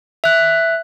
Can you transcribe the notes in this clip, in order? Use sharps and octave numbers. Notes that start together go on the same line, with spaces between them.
E5 F#6